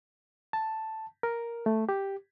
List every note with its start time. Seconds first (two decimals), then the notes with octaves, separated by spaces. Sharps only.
0.53 A5
1.23 A#4
1.66 A3
1.89 G4